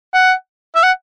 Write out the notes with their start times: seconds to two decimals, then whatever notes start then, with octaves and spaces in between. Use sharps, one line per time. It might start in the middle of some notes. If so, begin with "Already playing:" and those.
0.14 F#5
0.75 E5
0.83 F#5